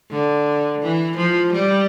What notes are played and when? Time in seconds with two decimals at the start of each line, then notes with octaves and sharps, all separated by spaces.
0.11 D3
0.82 E3
1.17 F3
1.53 G3